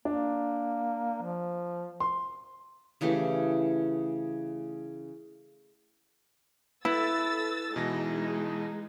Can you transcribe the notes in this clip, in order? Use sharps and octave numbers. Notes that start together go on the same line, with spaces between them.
A#3 D4
F3
C6
C#3 E3 A3 G4
E4 A4 B4 E6 A6
B2 E3 G#3 D#4 A#6